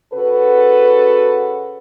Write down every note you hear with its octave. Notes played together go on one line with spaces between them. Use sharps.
C#3 F#4 A4 B4